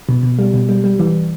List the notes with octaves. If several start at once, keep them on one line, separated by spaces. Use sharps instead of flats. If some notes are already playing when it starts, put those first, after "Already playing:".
B2
B2
G3
B2
G3
G3
E3